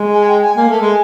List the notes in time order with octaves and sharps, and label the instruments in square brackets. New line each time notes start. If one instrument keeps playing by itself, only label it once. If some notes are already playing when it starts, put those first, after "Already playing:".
Already playing: [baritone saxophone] G#3
[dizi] G#5
G5
G#5
[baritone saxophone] A#3 [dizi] G#5
[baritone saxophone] A3
G#3